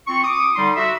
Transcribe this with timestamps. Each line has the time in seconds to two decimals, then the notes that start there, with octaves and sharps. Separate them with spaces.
0.08 C4 F4 C#6
0.24 D6 D#6
0.56 D3 G3 D#4 C6
0.76 F#4 E5